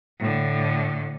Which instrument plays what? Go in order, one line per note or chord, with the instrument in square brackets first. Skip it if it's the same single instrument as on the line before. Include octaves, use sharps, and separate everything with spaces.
[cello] A2 D3